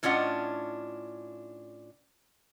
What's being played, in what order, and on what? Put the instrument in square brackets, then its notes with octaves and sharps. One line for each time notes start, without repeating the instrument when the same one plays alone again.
[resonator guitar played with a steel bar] A2 C#4 D4 F4 D#5 F#5